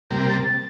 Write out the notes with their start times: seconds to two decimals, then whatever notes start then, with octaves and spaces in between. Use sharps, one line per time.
0.10 C3 G3 A#3 G6
0.28 A6